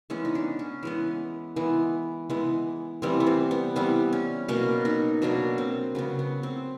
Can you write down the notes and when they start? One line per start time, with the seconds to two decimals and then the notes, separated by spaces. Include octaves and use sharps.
0.10 E3 G#3 B3 C#4
0.25 D#4
0.35 D4
0.59 C#4
0.83 E3 G#3 B3
1.56 E3 G#3 B3
2.30 E3 G#3 B3
3.02 E3 G3 B3 C4
3.20 B3
3.27 C4
3.51 B3
3.76 E3 G3 B3 C4
4.13 C#4
4.48 B2 F#3 A#3 C#4
4.85 D#4
5.22 B2 F#3 A#3 D4
5.58 C4
5.95 C#3 F#3 B3
6.19 B3
6.43 C4